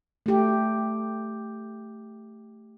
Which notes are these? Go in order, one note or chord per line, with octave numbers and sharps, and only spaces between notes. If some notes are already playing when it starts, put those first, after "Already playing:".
A3 G4